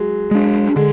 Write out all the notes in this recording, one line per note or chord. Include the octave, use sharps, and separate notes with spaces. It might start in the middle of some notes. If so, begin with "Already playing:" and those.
Already playing: F#3 G#3
G#3 D4
D3 G#3